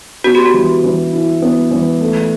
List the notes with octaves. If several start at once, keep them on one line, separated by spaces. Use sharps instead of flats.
B3 F#4
G4
F#4
E3
E3
E4
B3
E3
A3